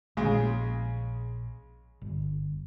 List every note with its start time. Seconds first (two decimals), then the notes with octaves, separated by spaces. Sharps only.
0.17 A#1 C#3 G#3
2.02 G1